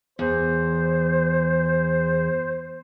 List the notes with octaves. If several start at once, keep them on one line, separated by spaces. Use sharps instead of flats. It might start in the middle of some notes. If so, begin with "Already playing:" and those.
E2 C5